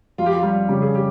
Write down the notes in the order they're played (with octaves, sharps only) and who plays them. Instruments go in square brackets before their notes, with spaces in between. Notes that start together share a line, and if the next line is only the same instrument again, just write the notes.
[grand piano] F2 [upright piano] F4
[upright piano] G4
F4
[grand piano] G3
[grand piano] C#3 [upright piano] G4
[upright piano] G#4
G4